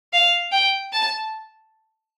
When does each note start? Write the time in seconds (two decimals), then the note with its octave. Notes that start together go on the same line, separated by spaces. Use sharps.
0.13 F5
0.52 G5
0.92 A5